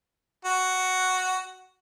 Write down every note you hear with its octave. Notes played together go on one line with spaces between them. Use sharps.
F#4